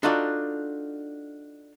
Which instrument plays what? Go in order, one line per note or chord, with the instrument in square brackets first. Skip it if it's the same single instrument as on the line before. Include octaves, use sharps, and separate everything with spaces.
[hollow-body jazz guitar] D4 D#4 F4 F#4 A4 D5